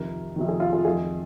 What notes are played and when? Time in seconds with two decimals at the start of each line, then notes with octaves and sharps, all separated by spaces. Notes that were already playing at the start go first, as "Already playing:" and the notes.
Already playing: F2 C3 D#3 A#4
0.36 F2 C3 D#3
0.48 G#4
0.60 F4
0.72 G#4
0.85 F2 D#3 G#4